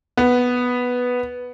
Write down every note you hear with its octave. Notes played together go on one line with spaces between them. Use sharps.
B3